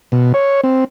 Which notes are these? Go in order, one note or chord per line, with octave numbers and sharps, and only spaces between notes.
B2
C#5
C4